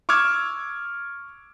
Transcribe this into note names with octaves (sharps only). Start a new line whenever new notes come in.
C#6 D6 E6 F6 G#6